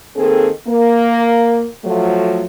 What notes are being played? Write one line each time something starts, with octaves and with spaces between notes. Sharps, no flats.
D#3 A#3 C4 G#4 A4
A#3
F3 F#3 A3